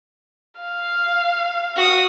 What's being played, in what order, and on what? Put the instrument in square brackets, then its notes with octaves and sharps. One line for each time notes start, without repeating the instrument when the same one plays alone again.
[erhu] F5
[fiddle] F#4 D#6